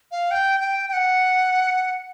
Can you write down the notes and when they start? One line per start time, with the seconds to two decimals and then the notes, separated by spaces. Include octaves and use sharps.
0.12 F5
0.31 G5
0.60 G5
0.88 G5
0.93 F#5